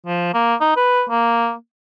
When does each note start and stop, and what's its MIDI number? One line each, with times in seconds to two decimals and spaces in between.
0.06 0.33 53
0.34 0.55 58
0.61 0.76 63
0.77 1.04 71
1.10 1.54 58